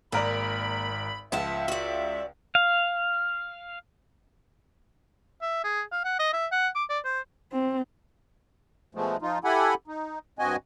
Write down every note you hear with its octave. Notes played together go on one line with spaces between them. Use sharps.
G#1 A#3 A#4 D5 B5
C#2 F3 B3 E5 A5
F#4 D5
F5
E5
G#4
F5
F#5
D#5
E5
F#5
D6
D5
C5
C4
B2 F3 G#3 A3
F3 D#4 F4
E4 G4 A4 F#5 G#5 B5
D#4
G2 C4 F#4 D#5 G#5